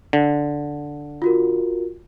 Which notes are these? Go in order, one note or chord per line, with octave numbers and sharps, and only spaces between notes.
D3
F4 F#4 A#4